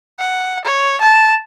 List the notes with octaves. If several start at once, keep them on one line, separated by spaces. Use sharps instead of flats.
F#5
C#5
A5